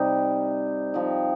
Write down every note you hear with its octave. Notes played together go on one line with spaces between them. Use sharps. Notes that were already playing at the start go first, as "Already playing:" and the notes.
Already playing: C3 G3 D#4
F3 C4 D#4